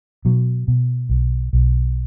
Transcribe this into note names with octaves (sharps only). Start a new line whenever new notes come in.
B2 F#3
B2
B1
B1